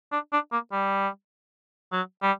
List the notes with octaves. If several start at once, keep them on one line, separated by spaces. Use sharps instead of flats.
D4
D4
A#3
G3
F#3
G3